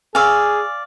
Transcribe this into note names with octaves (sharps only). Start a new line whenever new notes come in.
G#4 D5 F5 G#5 C#6 E6